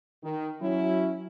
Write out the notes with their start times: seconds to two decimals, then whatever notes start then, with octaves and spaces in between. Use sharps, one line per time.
0.24 D#3
0.62 F#3 C#4 E4